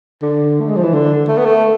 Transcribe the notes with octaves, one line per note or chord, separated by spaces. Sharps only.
D3
A3
G#3
F3
E3
D3
A3
B3
A3